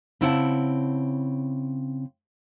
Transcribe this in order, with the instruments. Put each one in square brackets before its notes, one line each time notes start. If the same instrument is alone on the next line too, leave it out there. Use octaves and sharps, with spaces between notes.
[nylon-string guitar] C#3 C4 E4 F#5 G5 A5